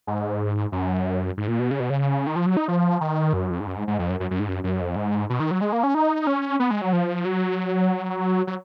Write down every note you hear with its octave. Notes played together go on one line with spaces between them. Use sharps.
G#2
F#2
G#2
A#2
B2
C#3
B2
C#3
D#3
F3
F#3
D#4
F3
D#3
F#2
F2
G#2
F#2
G#2
G#2
F2
F#2
F#2
F#2
G#2
F#2
F#2
F2
G#2
B2
D#3
F#3
G#3
A#3
C#4
D#4
C#4
B3
G#3
F#3
F3
F#3
F#3